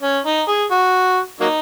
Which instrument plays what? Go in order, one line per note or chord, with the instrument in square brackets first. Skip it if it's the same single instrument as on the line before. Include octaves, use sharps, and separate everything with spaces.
[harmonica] C#4
D#4
G#4
F#4
F#3 A#3 D#4